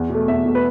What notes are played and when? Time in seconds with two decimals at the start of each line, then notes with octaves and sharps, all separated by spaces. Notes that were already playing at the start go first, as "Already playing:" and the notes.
Already playing: E2
0.10 B2 A3
0.28 E2 E5
0.46 B2 A3
0.55 B4